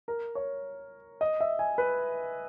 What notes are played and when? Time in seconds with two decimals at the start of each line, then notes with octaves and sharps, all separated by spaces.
0.08 A#4
0.35 C#5
1.21 D#5
1.41 E5
1.59 G#5
1.78 B4